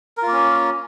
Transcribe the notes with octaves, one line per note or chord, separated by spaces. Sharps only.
A#3 C#4 F4 A#4